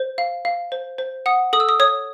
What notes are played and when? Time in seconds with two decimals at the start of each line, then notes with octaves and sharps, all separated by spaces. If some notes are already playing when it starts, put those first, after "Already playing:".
Already playing: C5
0.18 F5
0.45 F5
0.72 C5
0.98 C5
1.26 F#5 D#6
1.53 A4 D#6
1.60 E6
1.69 D#6
1.80 C#5 D#6